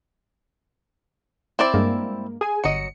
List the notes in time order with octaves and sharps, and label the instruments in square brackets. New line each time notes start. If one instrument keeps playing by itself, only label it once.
[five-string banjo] C4 E4 D5
[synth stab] G2 G#3 A#3
G#4 G#5
[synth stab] G1 C#7 [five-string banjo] F#3 D#5